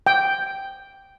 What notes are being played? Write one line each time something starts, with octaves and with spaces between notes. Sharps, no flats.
G5